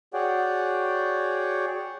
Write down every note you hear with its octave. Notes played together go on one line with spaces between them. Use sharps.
F#4 G#4 C#5 D5 F#5 G5